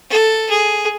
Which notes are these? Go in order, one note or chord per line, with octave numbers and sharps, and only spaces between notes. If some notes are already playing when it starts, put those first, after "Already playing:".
A4
G#4